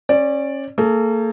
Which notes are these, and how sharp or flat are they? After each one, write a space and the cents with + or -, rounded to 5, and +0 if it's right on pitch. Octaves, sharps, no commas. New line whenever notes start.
C#4 -25 D5 +0
A#3 -40 G#4 +45